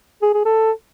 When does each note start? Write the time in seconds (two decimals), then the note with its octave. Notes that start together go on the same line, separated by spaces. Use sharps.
0.22 G#4
0.34 G#4
0.45 A4